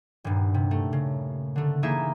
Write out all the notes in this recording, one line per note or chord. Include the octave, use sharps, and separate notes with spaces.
D#1 G2
C3
A3
C#3
D3 A3
E3 A#3 D#4 E4 G#4 E5